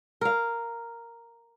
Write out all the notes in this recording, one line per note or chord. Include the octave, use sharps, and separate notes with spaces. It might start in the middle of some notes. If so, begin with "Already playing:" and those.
A#4 F5